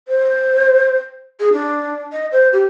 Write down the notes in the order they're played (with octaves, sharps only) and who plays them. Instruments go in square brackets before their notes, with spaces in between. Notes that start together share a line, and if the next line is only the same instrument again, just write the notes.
[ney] C5
G#4
D4
D#5
C5
G4